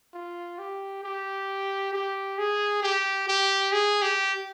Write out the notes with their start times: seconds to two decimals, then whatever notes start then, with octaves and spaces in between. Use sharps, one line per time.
0.14 F4
0.59 G4
1.04 G4
1.93 G4
2.38 G#4
2.83 G4
3.28 G4
3.72 G#4
4.02 G4